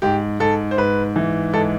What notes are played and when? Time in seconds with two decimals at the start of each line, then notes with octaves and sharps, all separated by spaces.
0.02 G#2 G4
0.40 G#2 A4
0.71 C5
0.78 G#2 B4
1.16 E3
1.53 G#2 A4